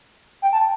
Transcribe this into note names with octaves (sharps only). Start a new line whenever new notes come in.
G5
A5